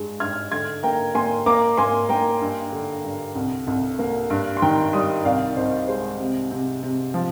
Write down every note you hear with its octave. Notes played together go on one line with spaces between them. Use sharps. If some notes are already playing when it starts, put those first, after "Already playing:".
Already playing: G2 G#3
G2 F6 G#6
D3 F6 G#6
A#3 G5 A#5
A#3 G#5 C6
A#3 A#5 D6
A#3 G#5 C6
A#3 G5 A#5
G2
D3
G2
C2
C2
A#3
G2
C6
D#3 G5 A#5
G3 C6 D#6
C2 D5 F5
C2 C5 D#5
G#3 C5
C3
C3
C3
F3